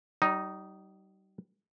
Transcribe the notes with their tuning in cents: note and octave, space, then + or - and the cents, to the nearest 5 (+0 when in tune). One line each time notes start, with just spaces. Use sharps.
G3 -35 D#4 +0